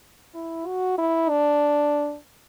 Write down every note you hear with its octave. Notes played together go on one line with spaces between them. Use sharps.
E4
F#4
E4
D4